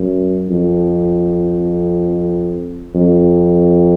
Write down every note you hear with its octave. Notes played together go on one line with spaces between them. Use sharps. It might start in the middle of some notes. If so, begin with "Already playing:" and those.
Already playing: F#2
F2
F2